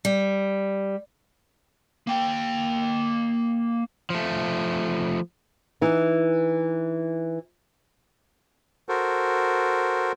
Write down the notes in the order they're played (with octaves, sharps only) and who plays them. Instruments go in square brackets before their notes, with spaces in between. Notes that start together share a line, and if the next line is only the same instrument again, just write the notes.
[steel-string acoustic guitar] G3
[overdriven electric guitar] A#3 G5
F3 A3
[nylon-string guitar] E3 D#4
[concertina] F#4 A4 A#4 C5